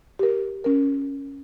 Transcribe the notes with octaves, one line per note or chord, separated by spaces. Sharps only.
G4 A#4
C#4 A#4